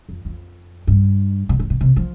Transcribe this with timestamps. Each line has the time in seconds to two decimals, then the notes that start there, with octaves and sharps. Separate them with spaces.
0.09 F2
0.25 F2
0.87 G2
1.49 B2
1.59 A2
1.70 B2
1.81 C3
1.96 F3